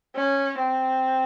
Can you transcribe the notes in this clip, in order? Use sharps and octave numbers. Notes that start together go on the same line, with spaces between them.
C#4
C4